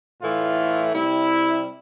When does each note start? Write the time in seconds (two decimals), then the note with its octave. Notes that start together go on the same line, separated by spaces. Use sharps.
0.21 A2 E3 A3 F4
0.94 C3 G3 E4